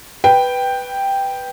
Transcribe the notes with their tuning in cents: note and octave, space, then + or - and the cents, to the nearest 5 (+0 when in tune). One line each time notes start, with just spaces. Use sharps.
B4 +0 G5 +0